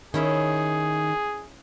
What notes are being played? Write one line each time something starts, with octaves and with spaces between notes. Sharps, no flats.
D#3 C#4 E4 G#4 E5